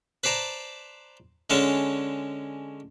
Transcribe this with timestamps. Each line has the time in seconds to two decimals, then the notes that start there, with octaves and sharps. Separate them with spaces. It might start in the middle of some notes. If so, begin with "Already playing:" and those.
0.24 B4 C5 D5 A5 A#5
1.50 D3 G#3 C#4 C#5 A5